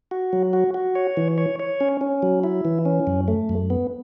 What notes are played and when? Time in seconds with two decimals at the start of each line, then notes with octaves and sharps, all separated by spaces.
0.11 F#4
0.33 F#3
0.53 F#4
0.74 F#4
0.95 C#5
1.17 E3
1.38 C#5
1.59 C#5
1.80 C#4
2.01 C#4
2.23 F#3
2.44 E4
2.65 E3
2.85 C#4
3.07 F#2
3.28 A3
3.49 F#2
3.70 B3